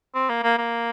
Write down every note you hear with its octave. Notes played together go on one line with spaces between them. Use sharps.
C4
A#3
A#3
A#3